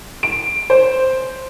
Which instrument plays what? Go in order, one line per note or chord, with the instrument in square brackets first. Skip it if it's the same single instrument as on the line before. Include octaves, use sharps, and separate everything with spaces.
[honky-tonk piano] D7
C5